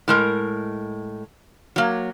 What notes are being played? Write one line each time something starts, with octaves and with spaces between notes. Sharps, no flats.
A2 G#3 A#4
F#3 A#3